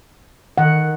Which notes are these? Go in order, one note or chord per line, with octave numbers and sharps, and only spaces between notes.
D#3 F#5